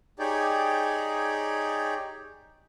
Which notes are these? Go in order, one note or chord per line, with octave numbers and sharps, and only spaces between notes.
D#4 G4 G#4 C#5 D5 G5